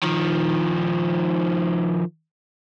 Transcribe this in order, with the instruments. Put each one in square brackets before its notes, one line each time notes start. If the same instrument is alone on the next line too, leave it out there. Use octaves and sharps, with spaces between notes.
[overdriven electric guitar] D#3 F3